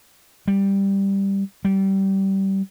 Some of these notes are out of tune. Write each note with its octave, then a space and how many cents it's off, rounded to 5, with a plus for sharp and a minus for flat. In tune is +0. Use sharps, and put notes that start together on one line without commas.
G3 +5
G3 -20